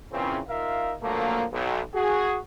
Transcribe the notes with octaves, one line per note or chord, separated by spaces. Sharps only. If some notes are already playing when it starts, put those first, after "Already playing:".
A#2 C#3 E3 C4
D#4 F4 A#4 E5 F5
D3 F3 F#3 A3 A#3
B1
F#4 G#4